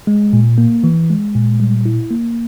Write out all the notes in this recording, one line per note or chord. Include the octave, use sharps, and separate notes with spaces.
G#3
A#2
A#3
E3
G#3
A#2
G3
E4
A#3